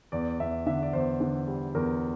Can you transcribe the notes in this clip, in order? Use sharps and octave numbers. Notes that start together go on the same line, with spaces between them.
E2 D5
E2 E5
D3 E5
D5
E2 C5
D3
G3
E2 A#4